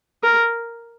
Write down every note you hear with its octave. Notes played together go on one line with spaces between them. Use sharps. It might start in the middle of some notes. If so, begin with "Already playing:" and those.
A#4